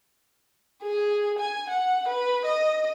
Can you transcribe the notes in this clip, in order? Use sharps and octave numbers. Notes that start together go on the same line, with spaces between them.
G#4
G#5
F#5
B4
D#5